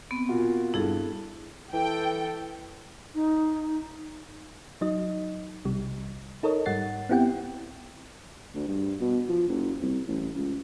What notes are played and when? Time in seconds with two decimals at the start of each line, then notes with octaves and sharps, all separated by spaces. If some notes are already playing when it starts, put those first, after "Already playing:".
0.11 B3 C4
0.29 A#2 F4 F#4
0.74 G2 E4 G#4 A4
1.73 E3 A4 G5
3.15 D#4
4.81 F#3 D#4 D#5
5.65 B1 C3 G3
6.43 D#4 A4 A#4 C#5 D#5
6.66 G#2 G3 F#5 A6 C7
7.09 B3 C4 E4 G4 F#5 G5
8.54 D2
8.68 G2
9.01 B2
9.28 F3
9.48 F#1
9.82 C2
10.08 A1
10.36 C#2